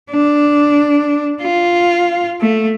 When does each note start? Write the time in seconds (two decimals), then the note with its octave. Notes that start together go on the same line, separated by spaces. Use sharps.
0.11 D4
1.41 F4
2.41 A3